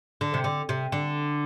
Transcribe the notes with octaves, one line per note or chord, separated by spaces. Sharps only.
D3
C3
D3
C3
D3